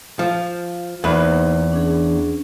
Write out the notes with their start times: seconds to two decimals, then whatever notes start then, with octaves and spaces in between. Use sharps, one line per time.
0.19 F3
1.04 E2 A#3 D#4 B4 C5
1.71 C#4 D4 G#4